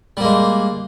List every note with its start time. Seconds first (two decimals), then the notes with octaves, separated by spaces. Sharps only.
0.17 G3
0.20 A#3
0.24 G#3